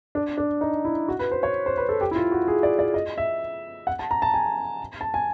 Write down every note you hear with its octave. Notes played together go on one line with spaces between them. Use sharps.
D4
D4
D#4
E4
F#4
B4
C5
C#5
C5
B4
A4
G4
E4
F4
F#4
G#4
D5
D5
D#5
E5
F#5
A5
A#5
A5
G#5
A5
G#5